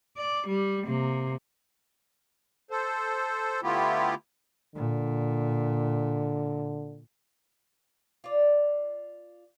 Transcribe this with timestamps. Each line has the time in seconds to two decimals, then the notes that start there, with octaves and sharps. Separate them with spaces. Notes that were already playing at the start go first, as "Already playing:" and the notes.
0.17 D5
0.48 G3
0.86 C3 A#3
2.71 A4 C5
3.63 D3 A3 B3 E4 F4 G4
4.76 A#2 D3
8.24 F4 D5